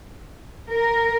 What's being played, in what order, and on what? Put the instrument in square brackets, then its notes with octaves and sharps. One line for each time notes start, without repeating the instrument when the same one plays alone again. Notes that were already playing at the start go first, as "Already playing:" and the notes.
[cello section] A#4